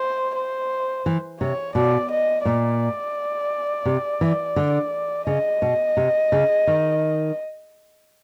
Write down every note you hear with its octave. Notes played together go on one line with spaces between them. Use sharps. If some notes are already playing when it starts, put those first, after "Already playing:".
Already playing: C5
C5
E3
C3 C#5
B2 D5
D#5
A#2 D5
C3
E3
D3
C#3 D#5
B2
C3
C#3
D#3